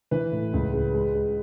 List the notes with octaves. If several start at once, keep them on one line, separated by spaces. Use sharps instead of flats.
E3 B4
A2
C#2
G#3
G#3
G#3